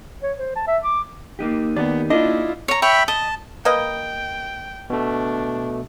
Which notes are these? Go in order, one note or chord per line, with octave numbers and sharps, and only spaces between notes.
C#5
C5
A5
E5
D6
A#3 D#4 G4
D#2 B3 D5
D4 E4 F4 D#5
C#5 A#5
C#5 E5 G5 B5
D#5 A5
A#3 B4 D#5 G5
B2 A3 D4